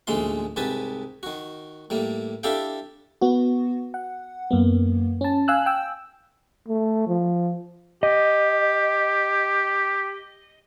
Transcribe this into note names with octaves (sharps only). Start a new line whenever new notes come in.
A1 D2 A#2 G#3 A#3 C6
C2 G#2 G4 B4 G#5 A5
D#3 F#4
A2 G3 A#3
D4 E4 G4 A4 F5 G5
B3 F#4
F#5
F#2 A#3 B3
C#4 A5
F5 G#5 E6 F#6
G5 E6
A3
F3
G4 D#5